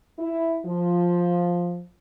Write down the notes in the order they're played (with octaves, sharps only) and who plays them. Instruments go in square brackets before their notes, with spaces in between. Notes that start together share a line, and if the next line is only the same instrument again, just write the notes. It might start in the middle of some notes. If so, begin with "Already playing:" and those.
[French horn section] E4
F3